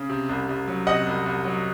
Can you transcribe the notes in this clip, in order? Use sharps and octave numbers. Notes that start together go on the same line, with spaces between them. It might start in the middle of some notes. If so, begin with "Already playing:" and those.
Already playing: C#3
C3
C2
C2
F#3
C3 D#5 F#5
C2
C2
F#3